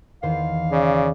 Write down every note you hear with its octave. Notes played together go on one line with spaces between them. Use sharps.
E2 D#3 C5 F5
C#3 D5